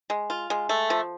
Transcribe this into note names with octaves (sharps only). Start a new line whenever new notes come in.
G#3
F4
G#3
A3
F3